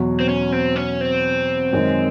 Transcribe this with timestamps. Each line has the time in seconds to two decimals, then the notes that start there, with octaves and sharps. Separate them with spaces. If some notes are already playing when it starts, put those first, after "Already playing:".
Already playing: E2 B2 F#3
0.20 C4
0.29 C#4
0.52 C4
0.76 C#4
1.01 C4
1.73 F#2 D#3 G#3